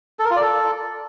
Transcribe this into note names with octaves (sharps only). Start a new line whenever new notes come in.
A4
A#4
F4
D5
A4